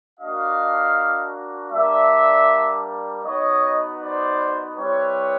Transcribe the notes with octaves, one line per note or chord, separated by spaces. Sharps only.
A#3 D4 F#4 D#5 F5
G3 A#3 D4 D5 E5
B3 D#4 F#4 C#5 D#5
C5 D5
G3 C4 E4 B4 C#5